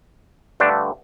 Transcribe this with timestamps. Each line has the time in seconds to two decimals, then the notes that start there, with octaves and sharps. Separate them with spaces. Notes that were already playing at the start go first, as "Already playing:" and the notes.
0.60 G2 D3 A3 D4